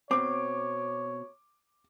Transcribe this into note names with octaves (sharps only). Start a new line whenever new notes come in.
B2 C4 C#5 D6